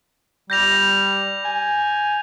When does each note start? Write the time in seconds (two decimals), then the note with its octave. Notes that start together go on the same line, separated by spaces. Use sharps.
0.50 G3 G6 A#6 F7
1.45 G#5